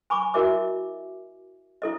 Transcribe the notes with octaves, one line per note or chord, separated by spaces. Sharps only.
G#5 B5 C#6 D6
E4 F#4 A#4 D#5 E5 D6
E4 A4 D#5